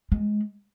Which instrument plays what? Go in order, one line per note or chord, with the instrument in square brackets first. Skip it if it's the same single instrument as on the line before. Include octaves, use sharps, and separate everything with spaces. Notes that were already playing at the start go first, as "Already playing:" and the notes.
[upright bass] G#3